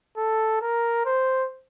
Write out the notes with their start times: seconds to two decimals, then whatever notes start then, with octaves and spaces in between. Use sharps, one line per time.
0.17 A4
0.62 A#4
1.06 C5